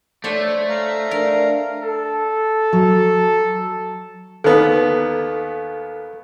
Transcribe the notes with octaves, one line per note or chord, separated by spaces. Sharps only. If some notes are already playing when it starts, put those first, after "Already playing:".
A3 D4 C5 C#5
F5 A#5
D4 A#4
A4
F#3
D#2 B3 A4